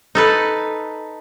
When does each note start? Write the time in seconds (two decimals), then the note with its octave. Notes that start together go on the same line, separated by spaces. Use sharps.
0.15 D#4 A4 B4